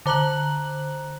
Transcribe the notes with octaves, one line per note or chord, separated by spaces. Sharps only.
D3 C5 A#5 F#6 F#7